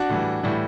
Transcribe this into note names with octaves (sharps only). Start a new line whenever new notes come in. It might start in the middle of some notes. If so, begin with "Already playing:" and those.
Already playing: D4 F#4
A2 E3 G3
A2 E3 G3